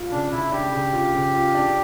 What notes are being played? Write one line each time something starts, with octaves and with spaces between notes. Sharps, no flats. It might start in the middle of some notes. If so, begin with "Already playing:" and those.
Already playing: F4
C#3 D4
C#3 E4
D4 G4
C#3
F4
C#3
F4
D4